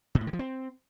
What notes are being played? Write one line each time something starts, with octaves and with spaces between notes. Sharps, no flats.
B2
A2
D3
F3
C4